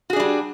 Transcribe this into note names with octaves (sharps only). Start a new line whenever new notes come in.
G3 D4 F#4 G#4